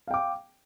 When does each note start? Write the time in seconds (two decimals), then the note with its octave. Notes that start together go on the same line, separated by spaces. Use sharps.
0.08 F5
0.11 G5
0.14 D6